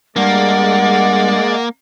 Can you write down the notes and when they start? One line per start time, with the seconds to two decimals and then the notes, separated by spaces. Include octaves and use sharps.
0.16 G2 G#3 A#3 D5 F#5